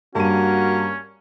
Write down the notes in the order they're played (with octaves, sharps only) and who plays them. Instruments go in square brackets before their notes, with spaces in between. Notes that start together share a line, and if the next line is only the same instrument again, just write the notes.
[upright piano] G2 D#7 [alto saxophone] A#3 [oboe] C#4 [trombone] F#4